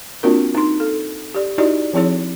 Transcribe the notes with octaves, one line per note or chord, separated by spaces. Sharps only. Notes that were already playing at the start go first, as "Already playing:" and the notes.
A#3 C4 D4 F4 F#4 A#4
D#4 C6
A4
G4 D5
D#4 E4 F#4 G4 D5 D#5
F3 C4 E4 G#4 C#5